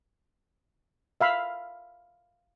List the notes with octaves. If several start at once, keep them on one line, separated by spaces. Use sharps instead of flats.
E5 F5 B5